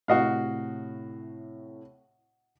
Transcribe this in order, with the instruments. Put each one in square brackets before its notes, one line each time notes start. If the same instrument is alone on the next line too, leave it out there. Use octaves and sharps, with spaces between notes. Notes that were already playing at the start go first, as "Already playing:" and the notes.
[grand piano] A2 C3 [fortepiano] F#4 D#5 F5